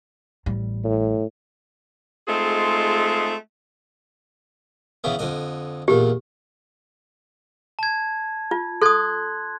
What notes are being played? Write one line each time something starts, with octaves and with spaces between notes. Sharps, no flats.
A1 G3
A2
G#3 A3 C4 D#4 F4 G#4
C#3 E3 B3
F2 D3 D#5
E2 A#2 G4
A5 G#6
F4
A4 C6 D#6 F#6 G#6